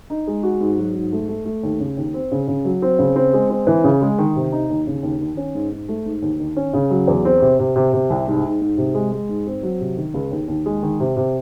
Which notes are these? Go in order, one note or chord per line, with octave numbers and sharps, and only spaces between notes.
D#4
G#3
F#4
G#2
F#3
G#2
A3
A3
A3
D#2
C#3
D#2
C4
C#3
C#3
F#3
C4
C#3
C4
G#3
C4
E3
C#3
G#3
D#3
C3
D#4
D#2
C#3
D#2
D#3
C#4
G#2
G#2
A3
G#2
D#2
D#3
C#4
C#3
F#3
E2
C4
C3
C3
C3
C3
C2
G#2
G#2
G#2
C3
G#3
G#3
G#2
C4
F#3
C3
D#3
C#2
D#2
D#2
G#3
D#3
C3
C3